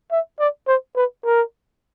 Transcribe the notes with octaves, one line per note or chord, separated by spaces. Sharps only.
E5
D5
C5
B4
A#4